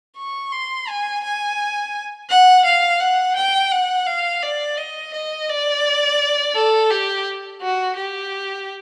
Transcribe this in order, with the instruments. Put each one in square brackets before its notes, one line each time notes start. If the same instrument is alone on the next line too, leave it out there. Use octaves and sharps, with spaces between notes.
[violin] C#6
C6
G#5
G#5
F#5
F5
F#5
G5
F#5
F5
D5
D#5
D#5
D5
A4
G4
F#4
G4